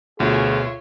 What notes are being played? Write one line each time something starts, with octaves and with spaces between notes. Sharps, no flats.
D2 B2 F4 G#4 C#5 E5